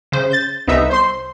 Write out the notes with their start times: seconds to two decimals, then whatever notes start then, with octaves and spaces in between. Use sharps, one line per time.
0.12 C#3 C5
0.31 G6 A6
0.68 C2 B3 D#4 E5
0.90 C5 C6